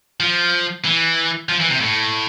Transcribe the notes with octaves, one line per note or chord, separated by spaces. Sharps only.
F3
E3
F3
E3
C3
A2